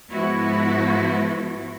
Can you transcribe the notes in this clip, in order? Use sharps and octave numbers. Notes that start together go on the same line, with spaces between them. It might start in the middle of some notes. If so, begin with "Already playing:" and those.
G#2 F3 B3 E4 F#4